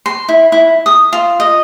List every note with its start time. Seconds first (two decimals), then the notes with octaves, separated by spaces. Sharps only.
0.06 C6
0.29 E4
0.52 E4
0.86 D#6
1.13 F4
1.40 D#5